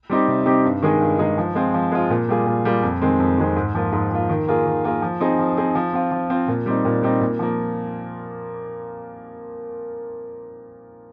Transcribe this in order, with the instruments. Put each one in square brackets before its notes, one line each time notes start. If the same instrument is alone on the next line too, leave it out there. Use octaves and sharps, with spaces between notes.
[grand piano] G3 C4 D#4 G4
C3
G3 C4 D#4 G4
G2
D#3 G#3 D#4 G#4
G2
D#3 G#3 D#4 G#4
F3
G#3 C4 F4
F3
G#3 C4 F4
A#2
G3 A#3 F4 G#4
A#2
G3 A#3 F4 G#4
F2
D#3 G#3 C4
F2
D#3 G#3 C4
G#2
F3 A#3 F4
G#2
F3 A#3 F4
D#3
A#3 F4 G#4
D#3
A#3 F4 G#4
F3
C4 D#4 G#4
F3
C4 D#4 G#4
F3
C4 F4
F3
C4 F4
A#2
G3 C4 D#4
A#2
G3 C4 D#4
A#2
F3 A#3